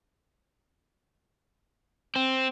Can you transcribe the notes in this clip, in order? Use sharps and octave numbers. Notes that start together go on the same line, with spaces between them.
C4